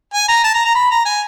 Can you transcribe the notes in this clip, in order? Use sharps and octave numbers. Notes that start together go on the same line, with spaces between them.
G#5
A#5
A5
A#5
A#5
B5
A#5
G#5